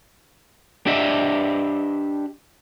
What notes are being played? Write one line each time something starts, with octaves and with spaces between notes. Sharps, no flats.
D4 G4 D#5 E5